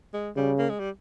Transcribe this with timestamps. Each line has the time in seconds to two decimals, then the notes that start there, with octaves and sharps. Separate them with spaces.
0.14 G#3
0.36 C#3 G3
0.58 A#3
0.70 G#3
0.80 G3